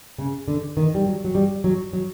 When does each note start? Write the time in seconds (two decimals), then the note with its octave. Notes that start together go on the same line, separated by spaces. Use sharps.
0.18 C#3
0.48 D3
0.77 D#3
0.95 G3
1.06 F#3
1.24 F#3
1.35 G3
1.64 F#3
1.93 F#3